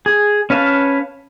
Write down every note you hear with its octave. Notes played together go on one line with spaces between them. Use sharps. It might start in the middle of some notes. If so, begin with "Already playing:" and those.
G#4
C#4 B4 F5 A5